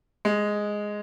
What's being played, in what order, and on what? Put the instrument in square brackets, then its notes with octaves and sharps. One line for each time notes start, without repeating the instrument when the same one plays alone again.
[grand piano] G#3